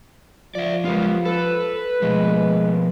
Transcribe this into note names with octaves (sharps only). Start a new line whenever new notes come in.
F3 D5 E5
F#2 G3 G#3 B3 F4
A4 B4
B2 F3 G#3